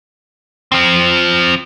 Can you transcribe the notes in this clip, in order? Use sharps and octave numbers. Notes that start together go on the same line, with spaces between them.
F3 C4